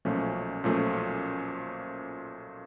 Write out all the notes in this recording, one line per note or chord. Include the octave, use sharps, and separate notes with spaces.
B1 A#2 F3 A3 C#4
B1 A#2 F3 A3 C#4